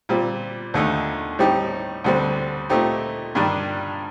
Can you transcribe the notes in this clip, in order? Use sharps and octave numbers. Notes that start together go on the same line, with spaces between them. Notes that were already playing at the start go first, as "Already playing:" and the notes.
A#2 G3 C4
D#2 D3 A3 D#4
A2 G3 C4 D#4 G4
D2 D3 G3 C4
A#2 A3 C4 D#4 G4
G2 D#3 G3 D4